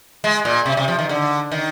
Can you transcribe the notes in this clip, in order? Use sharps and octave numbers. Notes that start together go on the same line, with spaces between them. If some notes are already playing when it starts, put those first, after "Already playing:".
G#3
A#2
C3
C3
F3
D#3
D3
D#3